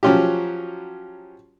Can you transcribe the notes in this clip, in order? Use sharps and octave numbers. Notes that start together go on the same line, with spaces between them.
F3 F#3 C#4 F4 G4